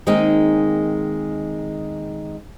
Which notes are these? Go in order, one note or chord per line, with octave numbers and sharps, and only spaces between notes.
D#3 G#3 A#3 C4 D#4 G#4